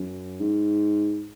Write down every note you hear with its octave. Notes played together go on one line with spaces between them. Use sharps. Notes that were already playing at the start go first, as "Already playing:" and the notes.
Already playing: F#2
G#2